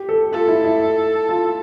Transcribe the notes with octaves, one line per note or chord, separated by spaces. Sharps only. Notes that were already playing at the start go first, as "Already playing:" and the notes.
Already playing: G4
A4
F4 A4
E4
E4
F4